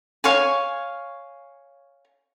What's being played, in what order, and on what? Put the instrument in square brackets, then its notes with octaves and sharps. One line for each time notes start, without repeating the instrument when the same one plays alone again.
[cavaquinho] C#5 F5 G#5